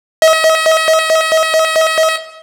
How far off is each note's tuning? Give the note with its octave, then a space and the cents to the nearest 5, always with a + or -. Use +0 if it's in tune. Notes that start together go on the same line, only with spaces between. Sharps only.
D#5 +45